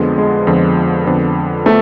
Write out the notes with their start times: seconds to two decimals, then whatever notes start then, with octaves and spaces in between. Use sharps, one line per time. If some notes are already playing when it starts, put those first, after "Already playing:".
Already playing: F2 D3 F3 G#3 B3
0.18 G#3
0.47 F2 D3 F3 B3
1.07 F2 D3 F3 B3
1.66 A3 B3